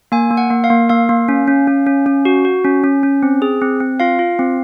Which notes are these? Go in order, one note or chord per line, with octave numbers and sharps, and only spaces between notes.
A#3 G#5
A#3
F#5
A#3
F5
A#3
A#3 F5
A#3
C#4
C#4
C#4
C#4
C#4
F#4
F#4
C#4
C#4
C#4
C4
G#4
C4
C4
F4 F5
F4
C4